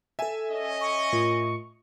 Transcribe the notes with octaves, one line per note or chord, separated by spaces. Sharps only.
A4 E5 G#5 A5
C#4 D#5
C#6
A2 F4 A#4